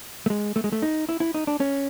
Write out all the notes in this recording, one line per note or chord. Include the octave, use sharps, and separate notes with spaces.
A3
G#3
A3
G#3
A3
D#4
E4
E4
D#4
D4
C#4